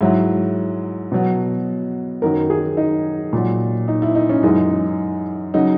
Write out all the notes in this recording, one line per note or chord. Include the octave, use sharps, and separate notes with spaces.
G#2 F#3 E4
B2 F#3
F#2 D#3 F#3 A#4
G#4
D#4
A#2 F#3
D#4
E4
D#4
C#4
F#2 E3 G#3 D#4
C#3 F#3 D#4